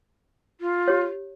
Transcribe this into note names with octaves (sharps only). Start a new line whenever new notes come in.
F4
G4 C#5